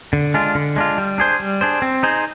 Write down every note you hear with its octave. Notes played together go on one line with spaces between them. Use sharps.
D3
G#3 D4 F4
D3
G#3 D4 F4
G3
D4 G#4 C5
G3
D4 G#4 C5
C4
D#4 G#4 C5